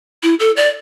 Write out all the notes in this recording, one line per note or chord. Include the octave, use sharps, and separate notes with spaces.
E4
A4
D5